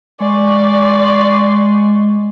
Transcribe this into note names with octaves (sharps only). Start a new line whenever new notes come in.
G#3 D5 G#5 C6 C#6